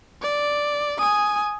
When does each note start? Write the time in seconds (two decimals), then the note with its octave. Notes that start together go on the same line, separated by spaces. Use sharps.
0.22 D5
0.98 G#5 D#6